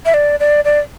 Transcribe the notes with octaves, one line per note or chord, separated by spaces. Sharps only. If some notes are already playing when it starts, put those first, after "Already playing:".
E5
D5
D5
D5